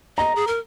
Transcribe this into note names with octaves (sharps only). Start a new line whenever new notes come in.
D#5 A#5
G#4
A#4